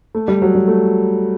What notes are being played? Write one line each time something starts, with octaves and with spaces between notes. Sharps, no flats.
A3
G3
F#3
G3
A3